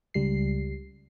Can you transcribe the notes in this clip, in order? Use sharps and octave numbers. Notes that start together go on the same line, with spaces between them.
C#2 G3 C7